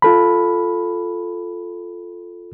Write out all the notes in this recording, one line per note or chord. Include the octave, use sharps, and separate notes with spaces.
F4 A4 B5